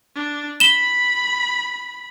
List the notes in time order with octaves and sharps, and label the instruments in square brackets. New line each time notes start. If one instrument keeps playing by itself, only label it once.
[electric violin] D4
[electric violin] B5 [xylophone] E7 G7